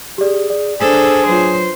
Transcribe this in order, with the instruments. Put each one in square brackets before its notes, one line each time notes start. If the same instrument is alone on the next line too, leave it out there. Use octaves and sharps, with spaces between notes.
[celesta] G4 D5 [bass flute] G#4
[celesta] D5
[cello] D4 A4 [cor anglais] G#4 [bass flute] C5
[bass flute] F#3 [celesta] F4 B4 [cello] C5